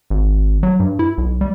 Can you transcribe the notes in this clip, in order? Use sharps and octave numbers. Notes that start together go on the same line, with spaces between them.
G#1
F#3
G2
E4
B1
G3